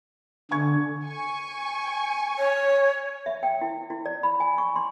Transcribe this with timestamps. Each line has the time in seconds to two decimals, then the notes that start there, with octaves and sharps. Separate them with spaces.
0.51 D3 G#5 C#6 G#6
1.05 G#5 C#6
2.38 C#5
3.26 E5
3.43 G5
3.61 E4
3.90 E4
4.05 D5
4.23 B5
4.40 G#5
4.58 C#6
4.76 C6